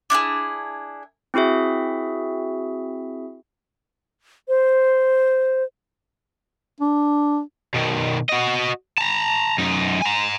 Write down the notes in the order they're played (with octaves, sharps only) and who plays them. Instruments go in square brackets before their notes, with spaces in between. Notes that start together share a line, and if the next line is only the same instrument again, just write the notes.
[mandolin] D4 E4 F#4 G#4
[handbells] C4 E4 F#4 G#4 E5
[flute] C5
[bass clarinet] D4
[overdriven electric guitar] B2 D#3
F#4 D#5
A5 A#5
F#2 D#4
G#5 A#5